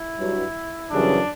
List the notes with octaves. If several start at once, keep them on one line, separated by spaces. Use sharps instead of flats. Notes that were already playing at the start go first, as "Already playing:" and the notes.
Already playing: E4
G2 F#3
F#2 C#3 E3 G3 D4